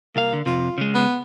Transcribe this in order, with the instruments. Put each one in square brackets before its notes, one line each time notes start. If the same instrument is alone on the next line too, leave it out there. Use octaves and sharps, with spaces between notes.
[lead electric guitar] C2 F5 [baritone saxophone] A#3
[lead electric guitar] D3
[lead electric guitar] F2 C3 [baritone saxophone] F4
[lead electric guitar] C#3 G#3
[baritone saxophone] B3